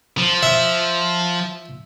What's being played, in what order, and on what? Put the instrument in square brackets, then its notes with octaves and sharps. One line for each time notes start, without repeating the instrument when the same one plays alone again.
[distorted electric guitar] F3
[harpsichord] E5